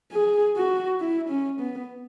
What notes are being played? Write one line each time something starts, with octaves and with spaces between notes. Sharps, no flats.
G#4
F#4
E4
C#4
B3